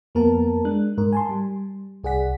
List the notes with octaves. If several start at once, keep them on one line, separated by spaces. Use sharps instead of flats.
F2 A#3 B3 A#4 A5
G#3 D4 F#6
G#2 A#4
G#5 A5 C6
G3
C2 G#4 D5 F#5 B6